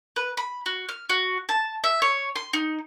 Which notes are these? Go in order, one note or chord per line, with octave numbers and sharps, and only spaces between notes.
B4
B5
F#4
F6
F#4
A5
E5
C#5
C6
D#4